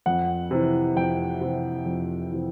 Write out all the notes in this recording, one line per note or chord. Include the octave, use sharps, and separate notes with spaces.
F2 F#5
C3 E3
F2 G5
C3 E3
F2
C3 E3